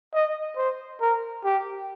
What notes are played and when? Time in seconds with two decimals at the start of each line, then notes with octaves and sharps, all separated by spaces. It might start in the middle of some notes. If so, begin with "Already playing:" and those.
0.14 D#5
0.57 C5
1.01 A#4
1.44 G4